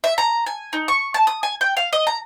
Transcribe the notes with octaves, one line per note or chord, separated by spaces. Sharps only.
E5
A#5
G#5
D#4
C#6
A5
D#6
G#5
G5
F5
D#5
A#5